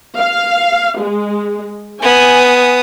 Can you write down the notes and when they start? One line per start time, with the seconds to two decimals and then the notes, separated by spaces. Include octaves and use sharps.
0.18 F5
1.00 G#3
2.01 B3 G#5 D#6